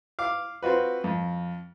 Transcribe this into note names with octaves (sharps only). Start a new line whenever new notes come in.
F5 D6
C4 F4 F#4 B4
F2